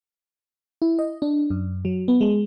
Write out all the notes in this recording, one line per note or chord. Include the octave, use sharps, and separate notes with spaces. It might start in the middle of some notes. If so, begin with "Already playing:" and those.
E4
D#5
D4
F#2
F#3
B3
G#3